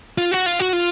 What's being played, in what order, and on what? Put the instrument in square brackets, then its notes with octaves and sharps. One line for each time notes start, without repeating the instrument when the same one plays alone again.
[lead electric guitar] F4
F#4
F4
F#4
F4